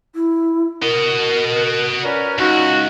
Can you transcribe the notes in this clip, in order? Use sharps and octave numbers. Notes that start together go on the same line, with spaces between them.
E4
F#4 A#4 D#5
C#4 A#4 B4 D5
C#2 D#4 F#4